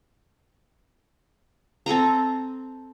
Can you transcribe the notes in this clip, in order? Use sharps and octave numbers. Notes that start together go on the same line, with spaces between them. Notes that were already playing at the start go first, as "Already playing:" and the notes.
C4 A4 D#5 A#5